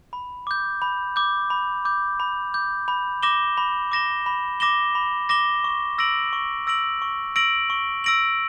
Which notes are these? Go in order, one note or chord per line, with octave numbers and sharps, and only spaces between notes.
B5
D6 G6
B5
D6 G6
B5
D6 G6
B5
D6 G6
B5
D6 A#6 E7 G7
B5
D6 A#6 E7 G7
B5
D6 A#6 E7 G7
B5
D6 A#6 E7 G7
C#6
E6 A#6 D7 F#7
C#6
E6 A#6 D7 F#7
C#6
E6 A#6 D7 F#7
C#6
E6 A#6 D7 F#7